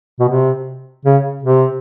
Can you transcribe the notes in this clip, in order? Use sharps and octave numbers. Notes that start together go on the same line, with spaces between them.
B2
C3
C#3
C3